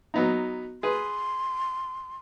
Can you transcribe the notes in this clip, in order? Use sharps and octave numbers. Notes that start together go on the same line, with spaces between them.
F#3 B3 D#4
G#4 B4 C6